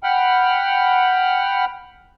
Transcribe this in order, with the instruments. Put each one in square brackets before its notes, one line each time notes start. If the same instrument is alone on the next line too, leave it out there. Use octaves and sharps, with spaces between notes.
[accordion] F#5 G5 B5 F6